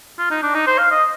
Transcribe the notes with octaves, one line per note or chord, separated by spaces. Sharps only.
F4
D#4
D4
D#4
C5
F5
D#5